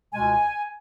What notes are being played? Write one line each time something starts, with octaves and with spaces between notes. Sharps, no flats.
C#2 B2 G#3 G#5